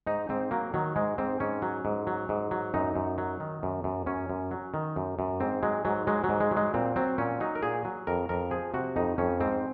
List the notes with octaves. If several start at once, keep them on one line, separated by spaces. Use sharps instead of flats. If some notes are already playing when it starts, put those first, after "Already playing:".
G#2 D#4
G#2 C4
F#3 A#3
D#3 F#3
G#2 G#3
G#2 C4
G#2 C#4
F#3
G#2
F#3
G#2
F#3
F#2 D#4
F#2
F#3
D#3
F#2
F#2
F#2 C#4
F#2
F#3
D#3
F#2
F#2
G#2 C4
F#3 G#3
G#2 F#3
F#3 G#3
F#3
G#2
G#3
F#3
G#3
A#2 C4
F#3 C4
A#2 C#4
F#3 D#4
A#4
A#2 G#4
F#3
F2 A#4
F2 A#4
F3 G#4
C3 F#4
F2 D#4
F2 C#4
G#2 C4